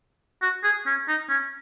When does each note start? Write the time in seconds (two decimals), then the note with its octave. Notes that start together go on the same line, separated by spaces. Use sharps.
0.42 F#4
0.64 G#4
0.86 C#4
1.08 D#4
1.30 C#4